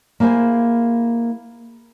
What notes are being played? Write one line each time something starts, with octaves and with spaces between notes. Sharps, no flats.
A#3 E4 G#4 C5 G#5